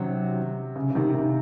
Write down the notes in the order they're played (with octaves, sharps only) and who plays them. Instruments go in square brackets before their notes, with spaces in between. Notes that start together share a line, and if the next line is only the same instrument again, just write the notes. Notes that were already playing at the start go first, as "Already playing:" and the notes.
Already playing: [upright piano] C3 [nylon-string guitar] D#3 F#3 C#4 F#4 C5
[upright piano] C#3
C#3
C3 D#3
C3 D#3